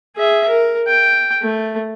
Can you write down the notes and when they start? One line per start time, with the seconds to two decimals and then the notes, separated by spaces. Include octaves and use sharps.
0.16 G#4 E5
0.48 A#4
0.87 G5
1.42 A3